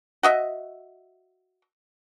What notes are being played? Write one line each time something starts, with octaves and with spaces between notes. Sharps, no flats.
F#4 D#5 E5